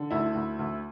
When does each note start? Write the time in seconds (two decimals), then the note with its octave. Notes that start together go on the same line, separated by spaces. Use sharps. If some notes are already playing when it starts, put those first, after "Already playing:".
Already playing: D3
0.10 D2 E4
0.35 D2
0.59 D2